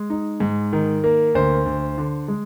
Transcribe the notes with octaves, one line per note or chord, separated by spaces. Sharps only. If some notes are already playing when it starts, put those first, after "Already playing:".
Already playing: G#3
D#4
G#2
D#3
A#3
D2 C5
D2
D3
G#3